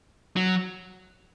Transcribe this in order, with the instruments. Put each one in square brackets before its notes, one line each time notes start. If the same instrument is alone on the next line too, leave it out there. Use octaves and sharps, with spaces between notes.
[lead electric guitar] F#3